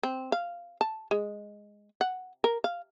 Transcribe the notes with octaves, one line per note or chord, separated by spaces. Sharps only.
C4
F5
A5
G#3
F#5
A#4
F5